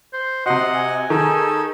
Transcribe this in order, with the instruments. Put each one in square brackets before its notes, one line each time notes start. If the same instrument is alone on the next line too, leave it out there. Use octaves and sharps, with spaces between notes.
[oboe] C5
[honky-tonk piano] C3 F#4 [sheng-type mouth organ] D#5 F#5 [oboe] C6
[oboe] G#5
[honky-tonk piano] D#3 [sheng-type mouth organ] G#4 A4